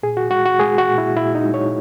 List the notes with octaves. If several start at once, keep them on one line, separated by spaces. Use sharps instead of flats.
A#2 G#4
F#4
G#3 F#4
F#4
G#3 G#4
F#4
A#2
E4
A#2 E4
D#4
G#3
C#5